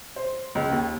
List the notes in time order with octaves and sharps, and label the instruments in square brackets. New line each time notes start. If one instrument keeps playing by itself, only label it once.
[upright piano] C5
C#2
D#2